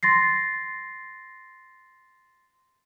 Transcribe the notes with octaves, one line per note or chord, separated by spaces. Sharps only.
C6 A6 A#6 C7